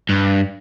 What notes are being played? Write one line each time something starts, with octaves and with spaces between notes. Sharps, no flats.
G2